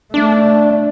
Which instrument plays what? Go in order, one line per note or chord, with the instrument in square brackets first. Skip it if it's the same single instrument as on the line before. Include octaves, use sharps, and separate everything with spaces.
[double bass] A3 [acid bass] D4